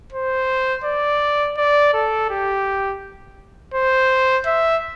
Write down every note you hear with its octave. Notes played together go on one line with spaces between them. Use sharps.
C5
D5
D5
A4
G4
C5
E5